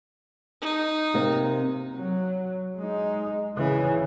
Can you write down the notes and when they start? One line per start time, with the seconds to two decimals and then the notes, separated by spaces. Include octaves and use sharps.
0.61 D#4
1.14 C3 A#3 C4
1.95 F#3
2.78 G#3 D#4
3.57 C#3 E3